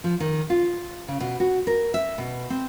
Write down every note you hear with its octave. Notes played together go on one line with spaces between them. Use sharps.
F3
D#3
F4
C#3
B2
F#4
A#4
E5
B2
C4